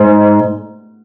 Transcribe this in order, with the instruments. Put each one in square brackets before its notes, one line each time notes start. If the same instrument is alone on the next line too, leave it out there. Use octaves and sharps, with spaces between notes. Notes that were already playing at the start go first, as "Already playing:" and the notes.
Already playing: [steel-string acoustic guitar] G#2